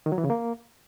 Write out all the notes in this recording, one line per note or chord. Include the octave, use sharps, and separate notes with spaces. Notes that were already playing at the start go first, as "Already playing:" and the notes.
D#3
F#3
E3
C#3
A#3